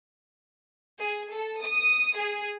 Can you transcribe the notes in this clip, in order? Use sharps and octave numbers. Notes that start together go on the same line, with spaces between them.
G#4
A4
D#6
G#4